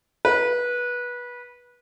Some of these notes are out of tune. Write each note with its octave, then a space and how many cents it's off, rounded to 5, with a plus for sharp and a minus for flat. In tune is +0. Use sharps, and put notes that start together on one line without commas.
B4 -20